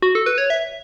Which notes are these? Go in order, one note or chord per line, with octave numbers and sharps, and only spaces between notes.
F#4
A4
B4
C#5
E5